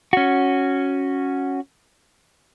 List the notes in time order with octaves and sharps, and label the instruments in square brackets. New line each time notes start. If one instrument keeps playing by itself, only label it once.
[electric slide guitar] C#4 F#4